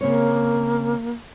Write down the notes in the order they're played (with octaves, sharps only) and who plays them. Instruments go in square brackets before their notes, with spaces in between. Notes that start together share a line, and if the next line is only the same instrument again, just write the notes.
[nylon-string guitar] C#3 C4 C#5 [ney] A#3